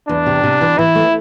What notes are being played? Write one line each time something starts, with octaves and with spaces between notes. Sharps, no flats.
E2 D4
C3
C3
E3
E3 E4
A3